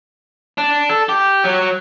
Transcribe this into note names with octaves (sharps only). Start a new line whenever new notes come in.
D4
A4
G4
F#3